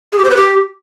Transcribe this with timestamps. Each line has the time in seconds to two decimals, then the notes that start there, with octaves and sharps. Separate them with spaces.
0.12 G#4
0.18 G4
0.24 C5
0.30 B4
0.36 G4